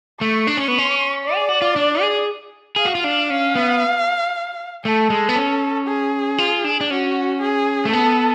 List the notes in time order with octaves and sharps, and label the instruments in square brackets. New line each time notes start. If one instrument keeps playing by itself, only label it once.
[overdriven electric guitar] A3 [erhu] C#6
[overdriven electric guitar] D4
C#4
B3
C#4
[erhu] D5
[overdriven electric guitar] G#4
F#4
F4
D4
G#4
[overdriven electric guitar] G#4 [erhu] F5
[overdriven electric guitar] F#4
F4
D4
[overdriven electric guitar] C#4 [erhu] F5
[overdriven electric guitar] B3
[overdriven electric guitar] A3 [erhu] A4
[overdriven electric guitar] G#3
B3
C#4
[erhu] G#4
[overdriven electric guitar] F4
D4
D4
[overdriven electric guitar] C#4 [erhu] F#4
[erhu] G#4
[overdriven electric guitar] A3
[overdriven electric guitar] B3 [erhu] A4